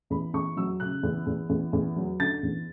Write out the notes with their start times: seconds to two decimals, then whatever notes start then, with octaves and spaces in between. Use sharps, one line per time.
0.10 E2 B5
0.33 E2 C#6
0.57 F#3 E6
0.80 C#3 F#6
1.03 E2
1.26 E2
1.49 E2
1.73 E2
1.96 F#3
2.20 D3 A6
2.43 E2